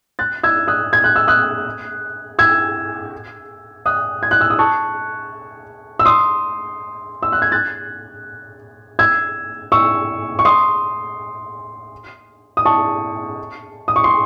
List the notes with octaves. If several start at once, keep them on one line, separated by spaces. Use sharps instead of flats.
F#6 A6
E6 G#6
D#6 F#6
G#6
F#6
E6
D#6 F#6
E6 G#6
D#6 F#6
G#6
F#6
E6
D#6
A5 C#6
E6
C6 D#6
E6
F#6
G#6
F#6 A6
E6 G#6
C#6 E6
C#6
C6 D#6
D#6
A5 C#6
D#6
C#6
C6